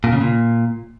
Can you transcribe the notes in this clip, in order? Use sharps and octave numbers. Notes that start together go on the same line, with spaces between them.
A#2
C#3
A#2